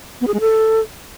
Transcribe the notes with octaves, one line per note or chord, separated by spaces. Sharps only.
B3
G#4
G#3
A4